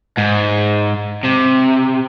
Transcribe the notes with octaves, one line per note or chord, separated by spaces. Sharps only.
G#2
C3